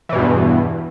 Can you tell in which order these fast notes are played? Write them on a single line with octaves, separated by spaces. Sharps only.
E3 B2 G2 E2